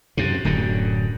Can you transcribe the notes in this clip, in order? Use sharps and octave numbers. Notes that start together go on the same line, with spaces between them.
F#2 C3
D1 F#2 D3